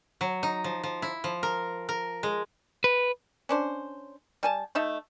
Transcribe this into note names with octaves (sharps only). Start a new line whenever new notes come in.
F#3
D#4
F3
F3
E4
F3
A#4
A#4
G#3
B4
C#4 D4 C5
G3 G#5 A5
A3 D#4 E5 A5